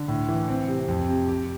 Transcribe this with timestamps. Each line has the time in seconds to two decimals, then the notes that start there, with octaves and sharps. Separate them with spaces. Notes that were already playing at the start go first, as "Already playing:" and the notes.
Already playing: D3
0.08 A2
0.28 E3
0.48 C4
0.68 C3
0.88 F2
1.09 C3
1.29 G4